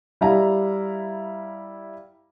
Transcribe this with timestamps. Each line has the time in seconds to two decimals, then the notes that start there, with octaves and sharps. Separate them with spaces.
0.21 G3 E4 F5 A#5